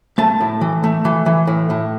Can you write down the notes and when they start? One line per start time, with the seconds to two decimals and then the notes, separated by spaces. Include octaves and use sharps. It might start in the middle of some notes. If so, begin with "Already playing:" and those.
0.18 A3 A5
0.41 A2
0.61 E3
0.84 A3
1.05 E3
1.26 E3
1.47 A2
1.70 A2